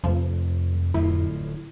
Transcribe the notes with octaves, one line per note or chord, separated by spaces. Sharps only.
F1 F2 F3
D1 A2 F3 E4